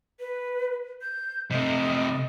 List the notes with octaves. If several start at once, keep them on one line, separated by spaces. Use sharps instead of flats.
B4
G6
C3 A3 D#5